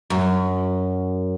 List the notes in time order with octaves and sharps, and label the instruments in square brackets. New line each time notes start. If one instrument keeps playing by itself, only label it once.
[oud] F#2